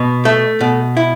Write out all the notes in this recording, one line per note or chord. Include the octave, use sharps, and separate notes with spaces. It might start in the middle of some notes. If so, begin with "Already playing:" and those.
Already playing: B2
A3
B2
E4